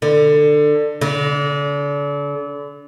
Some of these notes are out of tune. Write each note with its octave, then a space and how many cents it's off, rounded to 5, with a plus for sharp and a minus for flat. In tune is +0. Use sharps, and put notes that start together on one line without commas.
D3 +20
D3 -35